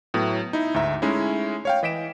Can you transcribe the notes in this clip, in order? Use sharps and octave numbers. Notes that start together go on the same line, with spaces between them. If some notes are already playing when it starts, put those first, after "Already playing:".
A2 F#3 B3
D#4 E4
D2 G#2 E5 A#5
G#3 A3 C#4 D#4 E4
C#5 F5 G5
E3 D#5 B6 D7 E7